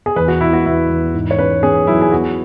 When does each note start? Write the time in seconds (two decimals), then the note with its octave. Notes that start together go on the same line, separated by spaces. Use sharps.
0.06 G#4
0.16 E2 B4
0.28 F#4
0.40 B3 E4
0.53 F#4
0.65 E2 E4
0.89 E2
1.14 G#2
1.31 C#5
1.39 C#4 B4
1.63 C#4 G#4
1.87 F#3 E4
2.02 G#4
2.12 B3 F#4